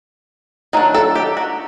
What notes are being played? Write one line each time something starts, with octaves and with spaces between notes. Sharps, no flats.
D#3 F#3 D4
A4
G4
F#4